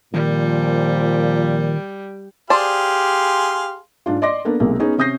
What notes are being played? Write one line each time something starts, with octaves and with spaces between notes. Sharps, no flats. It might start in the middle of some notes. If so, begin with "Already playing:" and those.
A#2 D#3 F3 G3
G4 G#4 C5 D5 F5 A5 C6
G#2 D4 F4
D5 D#5 C6 D6 A#6
A#3 B3 D4 A4
B1 C3 G#3 A#3
B3 C#4 D#4 G#4
C3 C#4 D#6 G6 A#6 C7